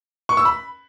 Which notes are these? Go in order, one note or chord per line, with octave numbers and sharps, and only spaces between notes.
C#6
E6
B5